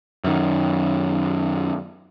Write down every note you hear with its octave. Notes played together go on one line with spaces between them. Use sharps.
F#2 D#3